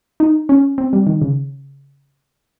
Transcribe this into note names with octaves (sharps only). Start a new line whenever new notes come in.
D#4
C#4
C4
G3
D#3
C#3